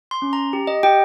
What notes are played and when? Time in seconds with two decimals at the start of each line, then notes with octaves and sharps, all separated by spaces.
0.11 C6
0.22 C#4
0.33 A#5
0.53 G4
0.67 D#5
0.83 G4 G5